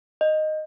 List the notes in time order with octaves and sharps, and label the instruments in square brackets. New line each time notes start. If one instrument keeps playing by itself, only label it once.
[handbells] D#5